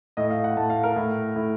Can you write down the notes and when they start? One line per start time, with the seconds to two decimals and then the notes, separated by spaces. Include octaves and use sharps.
0.17 A2 D#5
0.30 F5
0.44 F#5
0.57 A2 A5
0.70 F5
0.83 A#4
0.96 A2
1.36 A2